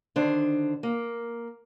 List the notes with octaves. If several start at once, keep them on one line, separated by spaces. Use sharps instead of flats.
D3 D#3 D4 C5
A#3